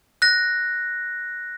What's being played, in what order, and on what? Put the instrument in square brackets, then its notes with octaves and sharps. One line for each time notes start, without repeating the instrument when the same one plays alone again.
[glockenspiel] F#6 A#6